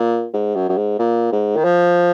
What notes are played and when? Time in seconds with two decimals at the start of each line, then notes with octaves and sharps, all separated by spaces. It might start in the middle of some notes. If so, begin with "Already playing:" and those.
Already playing: A#2
0.34 G#2
0.55 F#2
0.69 F#2
0.77 G#2
0.99 A#2
1.32 G#2
1.56 D#3
1.64 F3